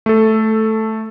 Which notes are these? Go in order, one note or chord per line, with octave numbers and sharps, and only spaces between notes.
A3 A4